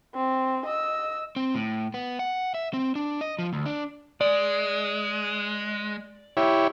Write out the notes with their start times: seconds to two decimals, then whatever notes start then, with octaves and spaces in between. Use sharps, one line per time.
0.15 C4
0.66 D#5 E6
1.36 C4
1.54 A2
1.94 B3
2.19 F#5
2.54 E5
2.73 C4
2.95 D4
3.21 D#5
3.39 F3
3.53 D2
3.66 D4
4.21 G#3 D5
6.37 E4 G4 C#5